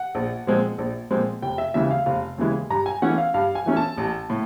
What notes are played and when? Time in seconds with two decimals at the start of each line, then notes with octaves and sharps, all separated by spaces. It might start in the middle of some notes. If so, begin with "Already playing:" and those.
Already playing: F#5
0.15 A#1
0.47 A#2 F3 G#3 C4
0.78 A#1
1.11 A#2 F3 G#3 C4
1.42 F1 G5
1.58 E5
1.74 D#2 C#3 E3 G#3 E5
1.91 F5
2.06 F1 F5
2.38 D#2 C#3 E3 G#3
2.70 G2 A#5
2.86 G#5
3.02 E3 A3 C#4 F#5
3.18 F5
3.34 G2 F5
3.55 G#5
3.66 E3 A3 C#4
3.77 A5
3.97 A1
4.30 A2